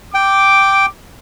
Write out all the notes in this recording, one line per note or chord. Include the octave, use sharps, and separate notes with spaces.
G5 D6